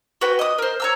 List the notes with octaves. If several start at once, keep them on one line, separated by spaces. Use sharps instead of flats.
F#4 B4 G5
D#5 D#6
A#4 C5
C#5 A#5 E6